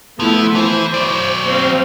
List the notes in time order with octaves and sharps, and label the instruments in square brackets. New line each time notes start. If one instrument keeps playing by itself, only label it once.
[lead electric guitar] F3 [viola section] A3 B3 E4
[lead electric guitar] E3 [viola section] C5
[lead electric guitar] F#3 D5
[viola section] C4 C5 F5